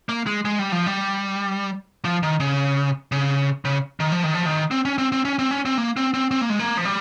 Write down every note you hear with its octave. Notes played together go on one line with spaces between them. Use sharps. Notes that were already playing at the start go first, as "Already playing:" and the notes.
A#3
G#3
G#3
G3
F3
G3
F3
D#3
C#3
C#3
C#3
D#3
F3
D#3
F3
D#3
C4
C#4
C4
C4
C#4
C4
C#4
C4
A#3
C4
C4
C4
A#3
G#3
A#3
F3
G3